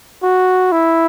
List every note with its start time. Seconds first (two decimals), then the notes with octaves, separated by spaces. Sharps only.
0.23 F#4
0.72 E4